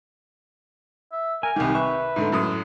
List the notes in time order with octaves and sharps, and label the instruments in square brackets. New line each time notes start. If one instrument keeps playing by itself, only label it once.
[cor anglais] E5
[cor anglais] A#4 [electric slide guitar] G#5
[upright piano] C2 D#3 [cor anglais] G4
[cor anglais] B4 [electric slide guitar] E5 [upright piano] C#6
[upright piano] G#2 D3 A3
F#2 A2 D#6